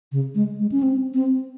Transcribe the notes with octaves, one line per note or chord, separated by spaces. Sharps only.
C#3
G#3
G#3
C#4
C4
C4